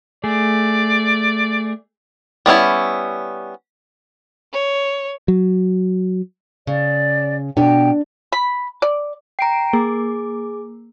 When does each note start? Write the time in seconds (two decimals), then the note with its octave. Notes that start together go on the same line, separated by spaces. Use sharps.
0.24 A3 G#4 D5
2.46 G3 B3 C#4 E4
4.53 C#5
5.28 F#3
6.67 C#3 D5
7.57 B2 D4 G4 G5
8.32 B5
8.82 D5
9.39 G5 A#5 C7 D7
9.73 A#3 G#4 D6